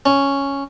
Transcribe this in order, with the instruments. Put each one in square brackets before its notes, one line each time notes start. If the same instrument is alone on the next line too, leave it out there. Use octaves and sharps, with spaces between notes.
[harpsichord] C#4